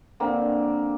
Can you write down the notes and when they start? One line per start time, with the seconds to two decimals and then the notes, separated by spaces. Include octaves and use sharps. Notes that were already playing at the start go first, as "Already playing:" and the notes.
0.20 D3 A#3 C4